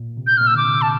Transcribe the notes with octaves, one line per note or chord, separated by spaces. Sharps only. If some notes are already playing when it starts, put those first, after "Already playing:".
Already playing: A#2
C3
G6
A#2 F6
E6
D3 D6
C3
A5